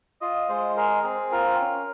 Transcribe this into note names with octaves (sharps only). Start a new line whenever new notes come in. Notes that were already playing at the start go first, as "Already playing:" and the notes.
F4 D#5
G#3 C5
G#4 A#4
C4 G#4
F4 A#4
C#4